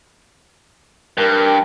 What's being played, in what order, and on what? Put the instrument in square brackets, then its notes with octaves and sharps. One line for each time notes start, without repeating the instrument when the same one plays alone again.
[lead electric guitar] G2 [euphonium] A#4